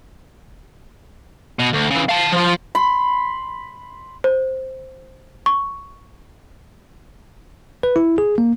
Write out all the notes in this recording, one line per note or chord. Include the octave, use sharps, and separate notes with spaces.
B2
D2
C#3 E3
F5 A5
F3 F4
B5 C6
C5
C#6
B4
E4
G#4
A#3